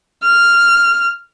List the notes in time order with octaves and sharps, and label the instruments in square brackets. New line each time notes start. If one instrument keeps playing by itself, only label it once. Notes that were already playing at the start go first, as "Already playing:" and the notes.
[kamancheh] F6